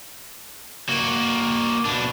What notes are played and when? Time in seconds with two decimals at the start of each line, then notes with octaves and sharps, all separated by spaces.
0.89 A#3 F#4
1.85 B2 D4